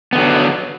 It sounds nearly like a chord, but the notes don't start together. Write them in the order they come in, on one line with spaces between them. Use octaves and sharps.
B3 D3 F#3